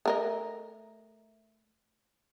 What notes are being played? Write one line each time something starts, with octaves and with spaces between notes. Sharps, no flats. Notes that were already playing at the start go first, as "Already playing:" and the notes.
A3 A#4 D#5